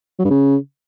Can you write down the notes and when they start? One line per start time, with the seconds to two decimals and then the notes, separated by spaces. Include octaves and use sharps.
0.19 F#3
0.25 G2
0.30 C#3